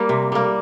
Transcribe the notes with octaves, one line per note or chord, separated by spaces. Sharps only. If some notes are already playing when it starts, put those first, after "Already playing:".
Already playing: G3 A#3
C3
G3 A#3